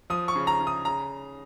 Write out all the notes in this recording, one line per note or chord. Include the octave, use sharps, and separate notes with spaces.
F3 D#6
C#6
C#3
A#5
C#3
D#6
C#3 A#5